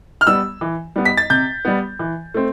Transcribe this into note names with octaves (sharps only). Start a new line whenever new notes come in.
F6
G3 B3 E6
E3
G3 B3
B6
A6
C3 G6
G3 B3
E3
A3 C4